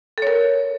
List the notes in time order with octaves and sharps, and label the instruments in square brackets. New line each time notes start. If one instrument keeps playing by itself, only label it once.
[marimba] A4
C#5
A#4